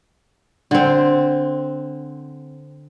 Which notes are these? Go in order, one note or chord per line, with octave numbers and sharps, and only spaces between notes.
D3 C4